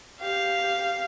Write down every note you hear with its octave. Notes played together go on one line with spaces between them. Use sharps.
G4 F5